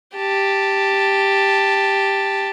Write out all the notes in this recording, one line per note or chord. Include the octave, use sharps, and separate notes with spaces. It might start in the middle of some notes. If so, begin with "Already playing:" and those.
G4 A5